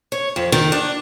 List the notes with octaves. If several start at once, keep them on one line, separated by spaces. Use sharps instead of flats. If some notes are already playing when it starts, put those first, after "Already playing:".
C#5
F2
D#3
D4